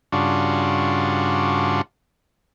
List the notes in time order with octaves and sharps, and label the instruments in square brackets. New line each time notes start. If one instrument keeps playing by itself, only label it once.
[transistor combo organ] G2 C#3 D4 F4 F#4